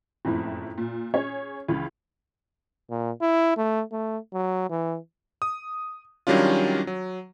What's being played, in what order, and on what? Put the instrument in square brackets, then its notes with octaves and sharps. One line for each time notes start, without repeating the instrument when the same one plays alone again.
[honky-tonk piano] F#1 F2 A2 E4
A#2
C#4 G#4 C#5
C#2 C#3 E3
[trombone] A#2
E4
A3
A3
F#3
E3
[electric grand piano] D#6
D#3 F#3 G3 C#4 D4 F4
F#3